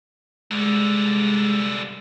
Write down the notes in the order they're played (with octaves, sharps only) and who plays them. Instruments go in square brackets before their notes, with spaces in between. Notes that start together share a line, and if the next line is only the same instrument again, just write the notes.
[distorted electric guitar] C2 D3 [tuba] G#3